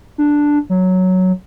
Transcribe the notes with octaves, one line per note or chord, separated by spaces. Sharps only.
D4
F#3